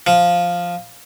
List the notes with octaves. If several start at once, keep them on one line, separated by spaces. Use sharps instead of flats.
F3